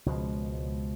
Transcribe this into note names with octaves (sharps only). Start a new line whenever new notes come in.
C#2 B2 F3 G#3